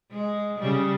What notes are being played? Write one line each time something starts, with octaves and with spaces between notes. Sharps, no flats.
G#3
C#3 G3